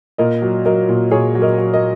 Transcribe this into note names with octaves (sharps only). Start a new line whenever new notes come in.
A#2 A#4 D#5
F#3
F#3 A#4 D#5
A#2
A#2 G#4 C#5
F#3
A#4 D#5
F#3
A#4 D#5